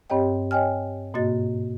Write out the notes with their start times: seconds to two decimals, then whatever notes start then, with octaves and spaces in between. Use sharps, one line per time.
0.10 G2 C4 G4 C#5 D#5 G5
0.51 C#5 D#5 G5 G#5 F6
1.14 G#2 B2 A#3 F#4 D#5 A6